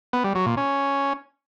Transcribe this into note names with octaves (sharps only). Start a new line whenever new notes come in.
B3
G3
F#3
A#2
C#4